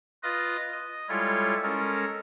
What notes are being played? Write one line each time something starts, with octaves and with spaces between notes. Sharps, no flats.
F4 B4 D#5 A6 A#6
D#5
G3 G#3 E4 F4 A4 C#5
G#3 C#4 A4 A#4